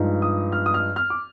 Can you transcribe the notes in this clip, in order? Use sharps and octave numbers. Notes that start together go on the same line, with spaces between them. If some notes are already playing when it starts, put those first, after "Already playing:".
Already playing: G2 F3 G#3 D#4
D#6
F6
D#6
F6
F6
D6